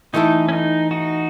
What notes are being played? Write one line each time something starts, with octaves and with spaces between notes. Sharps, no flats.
E3 A3 D#4 E4 A4
C#4
D#4
D#4 F#4